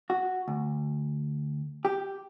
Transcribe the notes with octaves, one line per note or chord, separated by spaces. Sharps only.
F#4
D2
G4